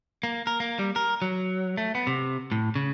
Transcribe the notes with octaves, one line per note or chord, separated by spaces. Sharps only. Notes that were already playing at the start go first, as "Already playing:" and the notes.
A#3
A#4
A#3
G3
A#4
F#3
A3
B3
C3
A2
C#3